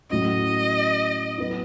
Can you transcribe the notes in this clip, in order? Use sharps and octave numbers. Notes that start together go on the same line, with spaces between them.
A2 F#3 C#4 D#5
F#3 B3 E4